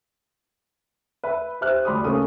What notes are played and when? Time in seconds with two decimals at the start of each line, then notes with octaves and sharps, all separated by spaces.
1.24 B4 E5 B5
1.61 G4 C5 E5 F6 F#6
1.85 D2 G3 B5 C6 D6 D#6
2.04 C#3 A3 A#3 C#4 A#4 D#6